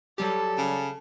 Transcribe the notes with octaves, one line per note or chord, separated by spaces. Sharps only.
F#3 G3 G4 A4
C#3